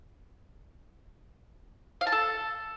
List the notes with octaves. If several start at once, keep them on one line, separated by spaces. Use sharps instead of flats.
F5
A5
A4